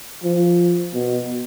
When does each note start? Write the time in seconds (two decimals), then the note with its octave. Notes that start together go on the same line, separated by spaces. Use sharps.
0.23 F3
0.94 B2